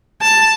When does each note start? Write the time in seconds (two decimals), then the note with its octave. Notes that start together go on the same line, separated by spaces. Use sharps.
0.22 A5